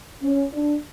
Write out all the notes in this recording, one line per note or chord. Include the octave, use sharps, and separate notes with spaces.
C#4
D4